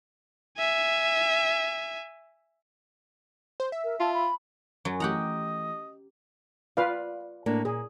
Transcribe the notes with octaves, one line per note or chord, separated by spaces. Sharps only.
E5 G#5
C5
E5
A#4
F4 A5
B5
F#2 F#3
E3 A3 G4 D#5 F#5 A#5
F4 B4 D5 F5
A2 A#3 D4
A#2 G#4